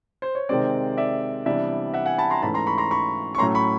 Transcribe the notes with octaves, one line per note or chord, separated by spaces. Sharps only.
C5
C#5
C3 D#3 G#3 C4 C5 D5
D5 E5
C3 E3 G3 B3 D4 D5 E5
E5 F#5
F#5 G#5
A5 B5
A#5 C6
G#2 E3 A3 C#4 A5 B5
A#5 C6
B5 C#6
A#5 C6
B5 C#6
C#6
A2 F#3 A3 C#4 A#5 C6
B5 C#6